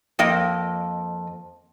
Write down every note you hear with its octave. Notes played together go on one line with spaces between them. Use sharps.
F2 A#3 D#5 G5